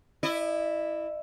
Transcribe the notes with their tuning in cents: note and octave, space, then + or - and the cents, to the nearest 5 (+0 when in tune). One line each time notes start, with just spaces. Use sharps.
E4 +0 D#5 -45